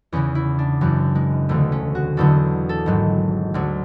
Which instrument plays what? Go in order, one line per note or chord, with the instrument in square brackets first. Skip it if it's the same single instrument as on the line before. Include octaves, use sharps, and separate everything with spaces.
[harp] E2 C#3 E3 C#4
E4
D4
F#1 F#2 E3
G#3
E1 D2 D3 A3
C#4
F#4
E1 E2 D3 F#3 A4
A4
G#1 G#2 F#3
D2 D3 F#3